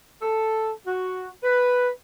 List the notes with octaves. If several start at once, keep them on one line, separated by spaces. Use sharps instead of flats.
A4
F#4
B4